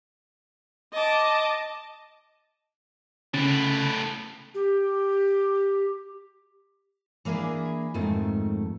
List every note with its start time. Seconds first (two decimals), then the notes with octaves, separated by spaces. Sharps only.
0.92 D#5 A5 D6
3.34 A2 C#3 B3 C#4 A6
4.55 G4
7.25 E3 A#3 D4 E4 G#4
7.94 F2 G#2 D#3 A3